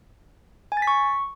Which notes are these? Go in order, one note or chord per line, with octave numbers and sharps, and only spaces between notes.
G#5
A6
B6
C#6